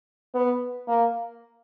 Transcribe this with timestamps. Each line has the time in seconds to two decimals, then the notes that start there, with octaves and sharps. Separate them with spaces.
0.34 B3
0.88 A#3